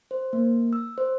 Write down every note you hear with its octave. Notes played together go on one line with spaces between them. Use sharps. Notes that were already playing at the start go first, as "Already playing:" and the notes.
C5
A#3
E6
C5